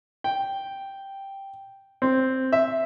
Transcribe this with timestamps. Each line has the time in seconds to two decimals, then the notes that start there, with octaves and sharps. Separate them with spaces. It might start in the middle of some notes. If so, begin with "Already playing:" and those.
0.24 G5
2.02 C4
2.52 E5